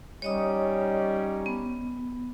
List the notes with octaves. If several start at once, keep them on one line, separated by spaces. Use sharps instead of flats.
G3 C#4 D#4 C#5 D#5 D#6
B3